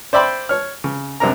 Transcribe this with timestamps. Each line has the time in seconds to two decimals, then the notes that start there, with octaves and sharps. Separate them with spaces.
0.13 C5 D5 E5 G5 B5 C6
0.49 C#5 F6
0.84 C#3
1.20 F#2 C3 C4 D4 A#4 A#5